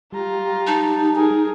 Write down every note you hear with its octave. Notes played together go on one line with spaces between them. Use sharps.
G3 F4 G4 A#5
D#4 A5
G#4 A#4 G#5